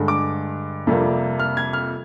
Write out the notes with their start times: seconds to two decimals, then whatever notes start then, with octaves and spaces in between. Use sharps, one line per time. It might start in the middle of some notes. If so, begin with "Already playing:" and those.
Already playing: G2 D3 G#3
0.08 D6
0.87 F2 C3 G3 A#3
1.40 F6
1.57 G#6
1.73 F6